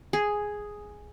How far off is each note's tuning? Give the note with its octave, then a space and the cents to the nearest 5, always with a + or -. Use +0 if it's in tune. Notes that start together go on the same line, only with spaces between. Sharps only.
G#4 +0